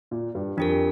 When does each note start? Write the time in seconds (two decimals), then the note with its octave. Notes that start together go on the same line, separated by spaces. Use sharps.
0.11 A#2
0.35 G2
0.57 F2 D4 G4 A#4